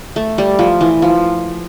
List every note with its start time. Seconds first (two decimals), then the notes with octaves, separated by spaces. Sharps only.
0.16 A3
0.38 G3
0.59 F3
0.81 E3
1.02 F3